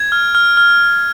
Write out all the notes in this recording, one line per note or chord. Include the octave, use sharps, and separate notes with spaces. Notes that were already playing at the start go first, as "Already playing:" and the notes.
Already playing: G#6
F6
F6
F6